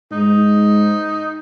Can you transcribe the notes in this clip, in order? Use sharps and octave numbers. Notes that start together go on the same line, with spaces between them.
G#2 D#4